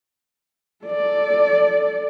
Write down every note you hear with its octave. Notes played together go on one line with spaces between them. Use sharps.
A4 D5